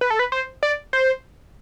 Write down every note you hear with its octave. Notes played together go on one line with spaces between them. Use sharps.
B4
A4
B4
C5
D5
C5